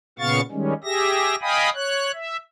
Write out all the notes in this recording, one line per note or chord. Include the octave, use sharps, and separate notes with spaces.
A#2 C#3 B3 F5 C#6 A6
D#3 G3 G#3 C#4
G4 G#4 E5 A#6
D#5 F5 G5 G#5 B5 D#6
C#5 F#6
E5